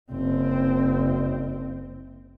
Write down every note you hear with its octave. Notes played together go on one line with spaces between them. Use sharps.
F#1 C4